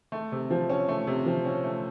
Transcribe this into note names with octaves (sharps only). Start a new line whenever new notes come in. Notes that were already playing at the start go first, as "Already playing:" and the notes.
A3
C3
F3
C#4
A3
C3
F3
C#4
A3